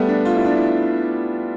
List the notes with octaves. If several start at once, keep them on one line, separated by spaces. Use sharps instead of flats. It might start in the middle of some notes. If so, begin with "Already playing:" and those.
Already playing: G3 A3 B3
D4
F4
E4
D4
E4